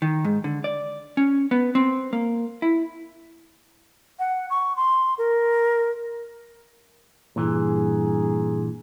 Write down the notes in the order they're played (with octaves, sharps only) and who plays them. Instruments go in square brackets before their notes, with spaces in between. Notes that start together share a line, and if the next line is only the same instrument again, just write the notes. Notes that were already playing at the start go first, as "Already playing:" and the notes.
[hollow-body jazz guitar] D#3
G#2
D3
D5
C#4
B3
C4
A#3
E4
[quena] F#5
C#6
C6
A#4
[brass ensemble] G2 G#4 [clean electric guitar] A#2 E3